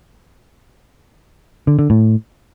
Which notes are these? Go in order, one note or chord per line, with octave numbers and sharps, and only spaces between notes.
D3
D3
A2